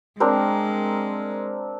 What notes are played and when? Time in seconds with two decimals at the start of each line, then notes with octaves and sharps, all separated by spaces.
0.20 G#3 C4 D4 A#4